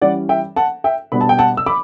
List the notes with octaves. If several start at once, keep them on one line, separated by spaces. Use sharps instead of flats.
E3 G3 C#4 D5 F#5
E5 G5
F#5 A5
E5 G5
B2 G3 B3 D4 B5
A5
G5
F#5 A5
E6
B5 D6